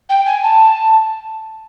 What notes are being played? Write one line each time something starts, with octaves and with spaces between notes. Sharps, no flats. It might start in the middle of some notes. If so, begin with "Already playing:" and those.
G5
G#5
A5